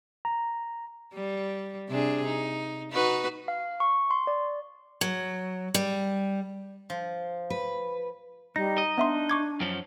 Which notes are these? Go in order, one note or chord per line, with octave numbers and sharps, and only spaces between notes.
A#5
G3
C3 D4 G#4
D#4
D#4 F#4 B4
F5
C#6
C6
D5
F#3
G3
F3
B4
G3 D#4 A#6
D#5
B3 D4 E5 C6
C#6 D6 G#6
F#2 F3 C#4